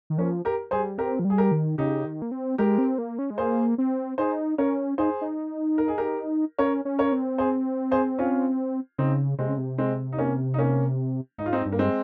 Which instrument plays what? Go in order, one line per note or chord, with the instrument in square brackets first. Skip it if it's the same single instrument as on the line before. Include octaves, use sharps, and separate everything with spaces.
[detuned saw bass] D#3
[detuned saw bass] F3 [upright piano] A#3 C#4
[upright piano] G4 A#4
[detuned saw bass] G3 [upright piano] G#4 C5
[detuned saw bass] C4 [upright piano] G4 A#4
[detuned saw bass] F3
G3
[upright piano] G#4
G4 A#4
[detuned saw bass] D#3
[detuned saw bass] C#3 [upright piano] D#4 G4
[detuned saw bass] D#3
A#3
C4
[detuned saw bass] G#3 [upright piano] G4 A#4
[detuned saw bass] C4
A#3
C#4
G#3
[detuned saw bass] A#3 [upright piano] G#4 C5
[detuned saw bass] C4
[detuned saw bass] D#4 [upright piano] G#4 C5
[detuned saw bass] C#4 [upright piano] A#4 C#5
[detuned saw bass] D#4 [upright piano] G#4 C5
[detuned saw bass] D#4
[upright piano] A#4
G#4
G4 A#4
[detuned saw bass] C#4 [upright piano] A#4 C#5
[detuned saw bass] C#4
[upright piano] A#4 C#5
[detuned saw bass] C4
[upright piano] G#4 C5
G#4 C5
C#4 F4
[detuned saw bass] C#3 [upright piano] C4 D#4
[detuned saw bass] C3 [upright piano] G#3 C4
[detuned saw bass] C#3
C3
[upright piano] G#3 C4
D#4
A#3 C#4
D#4
A#3 C#4
[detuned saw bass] G#2 [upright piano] D#4
[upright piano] F4
C4 D#4
[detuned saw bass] G2
[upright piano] A#3
G#3 C4